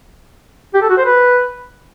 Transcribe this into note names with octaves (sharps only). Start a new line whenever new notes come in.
G4
A4
F#4
C5
B4